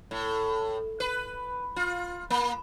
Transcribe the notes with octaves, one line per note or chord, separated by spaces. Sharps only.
A2
B4
F4
A#3